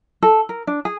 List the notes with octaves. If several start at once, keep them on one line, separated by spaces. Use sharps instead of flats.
A4
A#4
D4
G#4